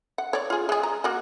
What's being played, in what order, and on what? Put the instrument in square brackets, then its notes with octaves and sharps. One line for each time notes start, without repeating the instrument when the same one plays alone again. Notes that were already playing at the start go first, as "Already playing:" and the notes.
[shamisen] F#5
C#5 D5
F4 G#4
G#3 G#4
A#5
A#3 F#4